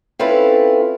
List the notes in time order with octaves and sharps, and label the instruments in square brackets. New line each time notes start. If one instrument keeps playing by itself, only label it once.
[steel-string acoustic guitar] C4 C#4 E4 F4 A4 B4